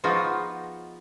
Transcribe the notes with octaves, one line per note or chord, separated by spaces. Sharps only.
F3 B3 D#4 F4 F#4 G#4